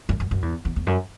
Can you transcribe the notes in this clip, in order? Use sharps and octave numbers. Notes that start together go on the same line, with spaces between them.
F#2
F#2
F#2
E2
E2
E2
F#2